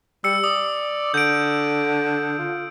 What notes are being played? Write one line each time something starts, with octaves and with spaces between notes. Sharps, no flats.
G3 E6 C#7
D5 D#6
D3 G6 D7
F4